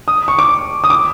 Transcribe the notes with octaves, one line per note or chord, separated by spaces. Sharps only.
D#6
C#6
D6
D#6
D6